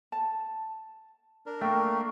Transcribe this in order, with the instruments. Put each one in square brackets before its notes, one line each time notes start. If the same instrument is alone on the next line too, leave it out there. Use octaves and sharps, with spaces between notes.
[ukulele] A5
[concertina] D4 A#4
[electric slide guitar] A3 A#3 [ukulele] G5 [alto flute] C#6